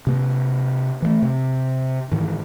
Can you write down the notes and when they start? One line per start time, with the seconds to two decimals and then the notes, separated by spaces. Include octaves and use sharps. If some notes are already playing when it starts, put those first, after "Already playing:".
0.07 C3 A#3
1.02 E3 F#3 A3
1.22 C3
2.12 G#2 D#3 E3